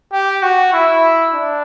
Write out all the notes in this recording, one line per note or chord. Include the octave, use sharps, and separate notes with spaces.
G4
F#4
E4
D4